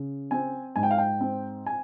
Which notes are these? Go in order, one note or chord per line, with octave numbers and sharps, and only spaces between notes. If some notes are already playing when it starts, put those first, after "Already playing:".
Already playing: C#3
C4 G#5
G#2 G#5
G5
F5
G5
C4
G#5